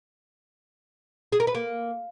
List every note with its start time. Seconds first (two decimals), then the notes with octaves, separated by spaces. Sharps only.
1.32 G#4
1.40 A#4
1.47 B4
1.55 A#3